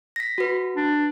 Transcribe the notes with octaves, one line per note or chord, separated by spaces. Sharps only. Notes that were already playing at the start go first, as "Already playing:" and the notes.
A#6 B6
F#4 B4
D4